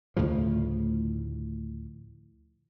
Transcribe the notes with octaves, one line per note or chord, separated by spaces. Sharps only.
D2 A2 C#3 F3